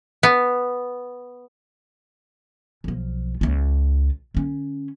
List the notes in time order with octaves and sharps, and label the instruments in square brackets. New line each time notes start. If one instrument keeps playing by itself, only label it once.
[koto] B3
[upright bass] B1 F3
C#2 F4
D3 C#4